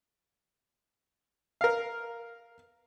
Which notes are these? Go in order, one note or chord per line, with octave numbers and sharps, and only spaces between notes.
A#4 F5